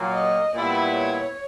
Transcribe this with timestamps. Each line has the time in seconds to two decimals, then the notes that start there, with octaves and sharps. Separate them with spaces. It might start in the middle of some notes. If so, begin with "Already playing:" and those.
Already playing: A#2 F#3 A#3
0.14 D#5
0.55 A#2 G3 B3 E4 D5
0.97 C#5